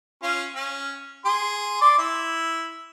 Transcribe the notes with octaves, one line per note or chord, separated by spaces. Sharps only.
C#4 F4
C#4
G#4 C6
D5 C6 D6
E4